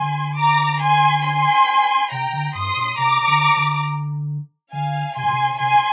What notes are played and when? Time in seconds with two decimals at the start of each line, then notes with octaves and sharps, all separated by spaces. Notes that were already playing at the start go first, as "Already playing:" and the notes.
Already playing: D3 G#5 C6
0.37 A#5 D6
0.81 G#5 C6
1.24 G#5 C6
2.11 C3 G5 A#5
2.33 D3
2.54 G2 C6 D#6
2.76 A#2
2.98 C3 A#5 D6
3.27 D3
3.56 D3
4.72 D3 F5 G#5
5.16 C3 G#5 C6
5.24 A#2
5.31 C3
5.60 C3 G#5 C6